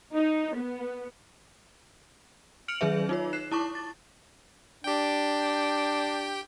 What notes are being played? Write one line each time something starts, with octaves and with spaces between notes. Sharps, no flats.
D#4
B3
F6 C#7 D7 F7 F#7
D#3 F#3 G#4 B4 E5
D#4 F4 C#5
F#6 C7 E7
E4 A5 C#6 D6
A6
D4 G4 G5